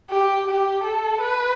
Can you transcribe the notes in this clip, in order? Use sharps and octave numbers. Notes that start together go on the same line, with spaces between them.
G4
G4
A4
B4